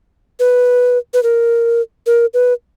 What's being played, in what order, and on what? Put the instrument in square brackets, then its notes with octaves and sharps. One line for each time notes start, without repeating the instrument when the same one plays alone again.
[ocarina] B4
B4
A#4
A#4
B4